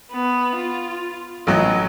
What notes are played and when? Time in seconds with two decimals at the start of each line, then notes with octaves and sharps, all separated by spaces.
0.12 B3
0.56 F4
1.47 A1 F#3 D#5